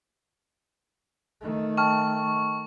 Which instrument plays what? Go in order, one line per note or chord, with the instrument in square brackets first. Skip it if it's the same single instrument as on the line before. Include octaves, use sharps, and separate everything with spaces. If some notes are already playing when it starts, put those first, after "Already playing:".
[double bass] D#3 A3
[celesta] G5 A5 F6 [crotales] C#6